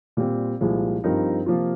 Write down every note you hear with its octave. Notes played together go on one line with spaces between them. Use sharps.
A#2 G3 C4
C2 A#2 F3 G#3
G2 F3 C4 D#4 A#4
C3 F3 A#3 F4